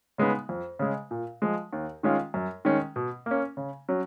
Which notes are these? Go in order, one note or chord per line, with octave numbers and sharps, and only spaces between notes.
C#3 G#3 B3 D#4
F2
C#3 G#3
A#2
F3 G#3
D#2
D#3 G#3 C#4 F4
F#2
D#3 G#3 C#4
B2
A#3 C#4
C#3
F#3 C#4